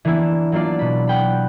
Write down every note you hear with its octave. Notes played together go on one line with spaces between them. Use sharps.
E3 A#3 B3 D4 E4
F#3 A#3 D4 F4 D5
B2 B5
F#5 G5 B5